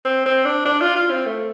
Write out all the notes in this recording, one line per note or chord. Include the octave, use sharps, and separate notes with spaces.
C4
C4
D4
D4
F4
F4
C4
A3